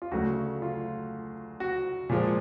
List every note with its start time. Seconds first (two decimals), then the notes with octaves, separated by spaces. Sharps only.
0.02 F4
0.11 D2 C#3 F#3 A3 F#4
0.62 F4
1.60 F#4
2.09 A#2 F3 G#3